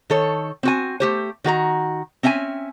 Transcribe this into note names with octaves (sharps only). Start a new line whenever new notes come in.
D#3 A4 C#5
C4 F#4 G#5
A3 G4 C5
D#3 F#4 A4 A#5
C4 C#4 E5 F#5 G#5